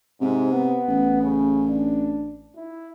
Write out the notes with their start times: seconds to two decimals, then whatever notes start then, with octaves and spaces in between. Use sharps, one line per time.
0.21 G#2 C3
0.52 B3
0.88 A1
1.23 C#3
1.68 D4
2.56 E4